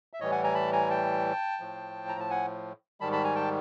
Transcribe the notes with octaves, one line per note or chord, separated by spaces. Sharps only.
E5
A2 E3 G3 C#5 D#5
F#5 G#5
G#5 A#5
A5 B5
G#5 A#5
G5 A5
A2 F3
A#5
A5
F#5 G#5
G#2 D#3 G3 A5 B5
A5 B5
G#5 A#5
G5 A5